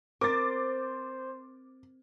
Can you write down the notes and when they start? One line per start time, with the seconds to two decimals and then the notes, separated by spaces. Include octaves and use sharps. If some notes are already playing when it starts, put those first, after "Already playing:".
0.21 C4 A#4 C5 D6 A6